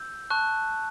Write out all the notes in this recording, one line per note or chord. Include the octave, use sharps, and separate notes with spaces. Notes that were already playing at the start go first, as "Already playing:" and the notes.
Already playing: E6 G6
A5 C#6 F#6